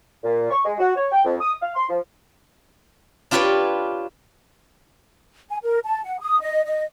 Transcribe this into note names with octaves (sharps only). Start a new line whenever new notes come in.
A#2
C#6
G#3
F#4
C#5
G5
F2
D#6
F5
C6
F3
D4 F4 G4 B4 C#5 D5
G#5
A#4
A5
F#5
D#6
D#5
D#5